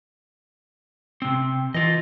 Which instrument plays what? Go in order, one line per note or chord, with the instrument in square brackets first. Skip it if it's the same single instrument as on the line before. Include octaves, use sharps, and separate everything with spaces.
[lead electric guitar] C3 C4
[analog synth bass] E3 [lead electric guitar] F4 D#5